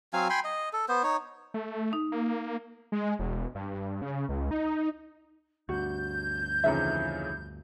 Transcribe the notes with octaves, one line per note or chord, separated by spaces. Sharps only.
F#3 C4 F5 G#5
G5 G#5 B5 C6
D#5
A4
B3 C5
D#4 C#5
A3
D#4
A#3
G#3
E1
G2
C#3
C#2
D#4
D2 G2 F#4 G6
F2 C#3 E3 D#4 E5